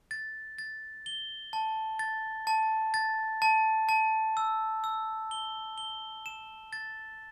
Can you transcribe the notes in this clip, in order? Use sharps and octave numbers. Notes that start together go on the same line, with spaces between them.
A6
A6
G7
A5
A6
A5
A6
A5
A5
E6
E6
G7
G7
E7
A6